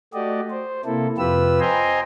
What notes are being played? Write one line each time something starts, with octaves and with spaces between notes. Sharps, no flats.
A3 F#4 G4 D5 D#5
C5
C3 A#3 E4 A4
F2 C3 F4 G4 B4 E6
C5 D#5 G5 G#5 A#5 C6